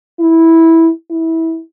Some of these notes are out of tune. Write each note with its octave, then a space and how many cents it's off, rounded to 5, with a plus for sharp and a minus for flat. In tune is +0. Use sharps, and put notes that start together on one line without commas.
E4 -10
E4 -20